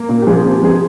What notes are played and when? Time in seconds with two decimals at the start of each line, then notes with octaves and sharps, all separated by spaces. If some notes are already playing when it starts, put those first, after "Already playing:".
Already playing: A#3
0.09 A#2
0.22 G4
0.27 F3 G#4
0.45 C3
0.51 G4
0.63 F3 G#4